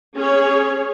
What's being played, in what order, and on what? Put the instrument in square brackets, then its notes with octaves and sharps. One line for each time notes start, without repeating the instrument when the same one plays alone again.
[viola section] C#4 G#4 C#5